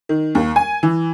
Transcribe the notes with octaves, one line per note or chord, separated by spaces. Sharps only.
D#3
D#2
G#5
E3